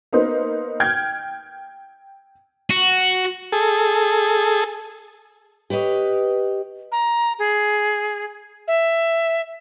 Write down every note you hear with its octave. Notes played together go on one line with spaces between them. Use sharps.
A#3 B3 D#4 B4 C5
G5 F6 G6 G#6
F#4
G#4 A4
G4 B4 C#5 D#5
A#5
G#4
E5